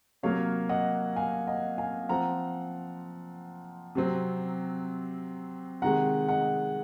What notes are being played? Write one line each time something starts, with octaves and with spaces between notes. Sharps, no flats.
C3 F#3 A#3 C#5 F5
D#5 F#5
F5 G#5
D#5 F#5
F5 G#5
F3 C4 F#5 A#5
C3 F#3 C4
C3 D#3 G#3 F#5 A#5
D#5 F#5